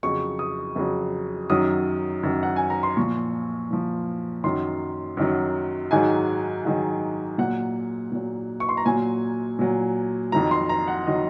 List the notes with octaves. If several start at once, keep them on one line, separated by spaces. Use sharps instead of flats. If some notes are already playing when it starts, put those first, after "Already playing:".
F2 C#3 F#3 C#6
D#6
F2 C#3 F#3
F#2 D#3 F#3 D#6
F#2 D#3 F#3
F#5
G#5
A#5
C6
A#2 F3 C#6
A#2 F3
F#2 D#3 F#3 C6
F#2 D#3 F#3
G#2 D#3 F#3 G#5
G#2 D#3 F#3
A#2 F#3 F#5
A#2 F#3
C#6
C6
A#5
A#2 F#3 G#5
A#2 F#3
F2 D#3 F#3 A#5
C6
A#5
F#5
D#3 F#3 D#5